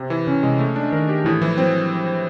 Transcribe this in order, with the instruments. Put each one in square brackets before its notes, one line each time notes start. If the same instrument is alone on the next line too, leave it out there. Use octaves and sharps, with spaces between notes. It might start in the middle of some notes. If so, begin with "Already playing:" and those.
Already playing: [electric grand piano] C3
E3
[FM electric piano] C#3 [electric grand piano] C#4
[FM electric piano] C3 [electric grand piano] G#3
[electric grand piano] A3
D4
[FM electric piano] D#3 [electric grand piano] A#4
[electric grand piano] G4
[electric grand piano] A2 [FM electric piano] E3
[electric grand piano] E3 [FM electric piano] F3
[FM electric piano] F#3 [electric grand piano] C4